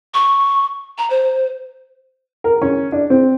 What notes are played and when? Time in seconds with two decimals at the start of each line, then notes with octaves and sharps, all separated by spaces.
0.14 C#6
0.98 A#5
1.10 C5
2.44 A#4
2.62 C#4
2.92 D4
3.10 C4